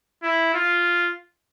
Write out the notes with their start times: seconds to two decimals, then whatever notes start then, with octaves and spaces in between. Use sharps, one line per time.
0.23 E4
0.54 F4